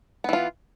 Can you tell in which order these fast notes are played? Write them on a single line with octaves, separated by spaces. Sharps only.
B3 E3 F4